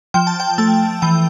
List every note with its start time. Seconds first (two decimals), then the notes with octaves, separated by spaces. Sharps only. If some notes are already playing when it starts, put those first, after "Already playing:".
0.14 F3 G5
0.27 A5
0.40 G5
0.58 A3 A5
1.02 E3 G5